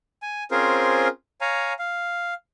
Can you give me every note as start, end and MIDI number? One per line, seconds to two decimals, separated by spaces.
0.22 0.44 80
0.51 1.08 60
0.51 1.08 61
0.51 1.08 65
0.51 1.08 68
0.51 1.08 70
0.51 1.08 72
1.41 1.73 73
1.41 1.73 77
1.41 1.73 80
1.41 1.73 82
1.79 2.34 77